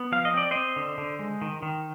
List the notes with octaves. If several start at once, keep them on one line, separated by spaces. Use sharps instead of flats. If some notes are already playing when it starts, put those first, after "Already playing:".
Already playing: B3
F3 F5
D#5
C4 D5
C4 C5 D#5
D3
D3
G#3
D#3
D#3